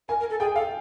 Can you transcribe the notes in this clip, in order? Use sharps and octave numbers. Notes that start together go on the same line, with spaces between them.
A#4 G#5
A#4
A4
G#4 G5
A4 F5